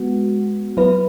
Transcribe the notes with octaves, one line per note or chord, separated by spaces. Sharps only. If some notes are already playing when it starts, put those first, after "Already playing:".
Already playing: G#3 B3 F#4
F#3 B3 E4 B4